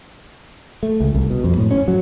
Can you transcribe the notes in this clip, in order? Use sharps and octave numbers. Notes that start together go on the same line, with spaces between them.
A3
C#2
C2
B2
F2
A2
C#4
F#3